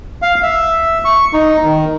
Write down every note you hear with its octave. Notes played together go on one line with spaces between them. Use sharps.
F5
E5
C#6
D#4
D#3